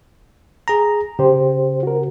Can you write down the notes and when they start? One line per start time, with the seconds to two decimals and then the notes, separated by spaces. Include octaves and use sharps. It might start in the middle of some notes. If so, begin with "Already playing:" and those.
0.68 G#4 A#5
1.19 C#3 G4 C5
1.83 F#4 A#4